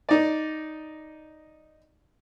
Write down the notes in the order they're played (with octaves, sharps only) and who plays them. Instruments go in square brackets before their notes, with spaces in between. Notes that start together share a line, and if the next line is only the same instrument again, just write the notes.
[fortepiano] D#4 D5